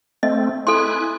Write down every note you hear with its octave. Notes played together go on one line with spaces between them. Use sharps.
A3 C4 D#5
E4 A4 G#5 C6 F#6